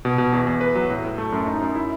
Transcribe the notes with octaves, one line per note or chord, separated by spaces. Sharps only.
B2
B2
E2
E2
B4
F#3
A2
A2
A3
F#2
D#4
F#2
E4